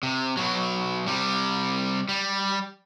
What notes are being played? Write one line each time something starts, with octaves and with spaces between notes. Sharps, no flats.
C3
B2 F#3
C3 G3
G3